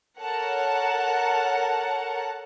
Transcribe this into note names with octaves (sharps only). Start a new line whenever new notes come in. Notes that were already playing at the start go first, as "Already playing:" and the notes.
A4 A#4 C#5 F#5 A5 A#5